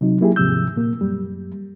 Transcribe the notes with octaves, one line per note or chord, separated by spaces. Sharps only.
C3 F#3 D#4
F#3 A#3 E4 G4 G#4
D#2 G#2 C3 F3 E6 G6
A#2 A#3
F#2 G3